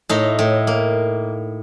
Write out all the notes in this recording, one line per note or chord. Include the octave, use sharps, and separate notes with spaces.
A2 D#4
A2
A#3